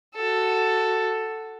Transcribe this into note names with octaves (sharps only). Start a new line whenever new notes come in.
F#4 A4